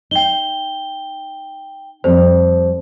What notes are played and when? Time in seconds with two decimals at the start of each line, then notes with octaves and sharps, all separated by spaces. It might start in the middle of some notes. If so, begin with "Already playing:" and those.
0.11 D#4 G5 G7
2.04 F2 G3 C4 C5